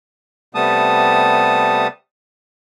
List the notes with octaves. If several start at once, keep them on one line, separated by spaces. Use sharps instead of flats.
C3 G3 A3 B3 A5 D#6